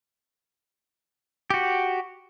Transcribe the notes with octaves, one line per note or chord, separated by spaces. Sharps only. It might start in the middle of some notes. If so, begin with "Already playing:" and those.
F#4 G4